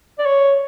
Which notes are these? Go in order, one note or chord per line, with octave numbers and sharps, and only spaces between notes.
D5
C#5